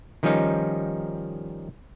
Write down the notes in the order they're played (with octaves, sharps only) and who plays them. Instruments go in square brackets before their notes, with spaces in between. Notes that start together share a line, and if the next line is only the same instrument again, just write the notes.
[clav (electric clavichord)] D#3 F3 G3 C#4 D#4